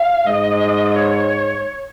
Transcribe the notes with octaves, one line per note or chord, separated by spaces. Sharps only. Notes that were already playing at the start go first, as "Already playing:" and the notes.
Already playing: F5
G#2 D#5
C#5